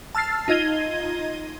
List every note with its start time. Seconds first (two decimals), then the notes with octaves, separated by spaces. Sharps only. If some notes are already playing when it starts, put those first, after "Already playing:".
0.15 A5 E6 F6 A6 C7
0.48 D#4 F4 D#5 G#6 D#7 G7